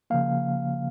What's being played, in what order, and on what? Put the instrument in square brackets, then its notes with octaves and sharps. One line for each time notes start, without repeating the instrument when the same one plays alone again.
[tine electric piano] C#3 F3 A#3 F5